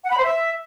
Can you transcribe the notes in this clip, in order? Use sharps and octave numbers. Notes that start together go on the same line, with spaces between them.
F#5
B5
C5
E5